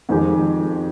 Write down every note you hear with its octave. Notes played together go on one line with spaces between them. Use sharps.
F2 D#3 G#3 C4 G4